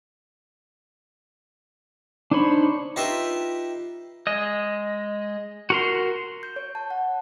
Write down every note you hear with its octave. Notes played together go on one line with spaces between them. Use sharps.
D4 D#4 C5 C#5 B5
D#4 F4 G4 B4 D#5 E5
G#3 D#5
F#4 A#4 C6
G6
C#5
A5
F#5